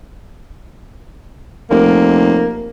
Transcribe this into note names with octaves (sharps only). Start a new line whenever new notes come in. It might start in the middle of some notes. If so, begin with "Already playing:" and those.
F1 A#3